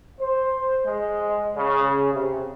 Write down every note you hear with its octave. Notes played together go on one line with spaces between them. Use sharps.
C5
G#3
C#3
C3